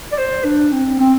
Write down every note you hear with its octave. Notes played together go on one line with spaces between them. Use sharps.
D5
C5
D4
C4
C4